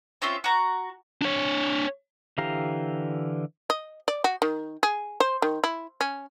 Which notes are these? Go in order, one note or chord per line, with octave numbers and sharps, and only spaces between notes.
C4 C#4 F4 E5
F#4 A#5
D4 C#5
D3 E3 G4 F5 A#5
D#5
D5
F#4
D#3
G#4
C5
D#3
E4
C#4